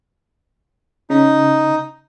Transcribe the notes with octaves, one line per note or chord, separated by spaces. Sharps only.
C#3 D#4